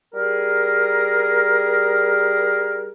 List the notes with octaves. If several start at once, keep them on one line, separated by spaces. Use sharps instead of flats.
G3 G#4 A#4